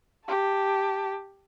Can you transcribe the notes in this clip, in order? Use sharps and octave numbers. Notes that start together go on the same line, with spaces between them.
G4 A5